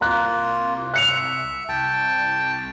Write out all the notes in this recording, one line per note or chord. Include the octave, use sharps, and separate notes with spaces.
C2 A#3 F4 A#5 F#6
E5 F#6 C#7 F7
C2 G5 A5